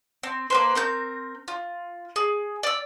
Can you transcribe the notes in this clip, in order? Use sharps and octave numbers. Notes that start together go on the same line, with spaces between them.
C4
A#3 B4 C5
C4 A#4 G6
F4
G#4
D5 E6